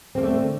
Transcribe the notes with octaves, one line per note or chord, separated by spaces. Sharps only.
D3 A3 A#3 C4